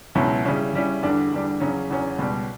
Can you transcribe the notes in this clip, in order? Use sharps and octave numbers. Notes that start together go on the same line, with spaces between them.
C#2 B2 F#3 C#4 E4
C#3 G3 C#4 E4
C#3 G3 C#4 E4
E2 D3 G3 D4
E2 D3 G3 D4
E2 C#3 F#3 C#4
E2 C#3 F#3 C#4
C#2 B2 G3